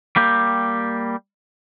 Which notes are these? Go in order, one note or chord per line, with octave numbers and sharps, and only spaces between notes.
G3 A#3 G4